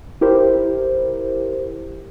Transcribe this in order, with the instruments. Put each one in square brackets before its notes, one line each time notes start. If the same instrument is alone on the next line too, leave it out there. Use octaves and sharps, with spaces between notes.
[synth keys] E4 G4 A#4 C5